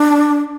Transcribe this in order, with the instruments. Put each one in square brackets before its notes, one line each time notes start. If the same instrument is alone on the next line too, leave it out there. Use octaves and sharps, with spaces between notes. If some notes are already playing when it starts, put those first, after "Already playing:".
Already playing: [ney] D4